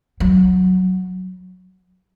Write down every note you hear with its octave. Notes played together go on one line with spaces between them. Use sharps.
F#3